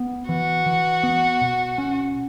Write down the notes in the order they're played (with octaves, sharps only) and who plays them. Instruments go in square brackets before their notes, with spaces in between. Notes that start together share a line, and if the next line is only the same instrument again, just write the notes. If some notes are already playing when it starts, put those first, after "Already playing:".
Already playing: [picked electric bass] B3
[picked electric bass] E3 [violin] F#4
[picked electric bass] E3
B3
B2
C#4